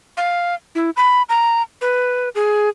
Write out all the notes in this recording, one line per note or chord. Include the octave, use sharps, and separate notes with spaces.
F5
E4
B5
A#5
B4
G#4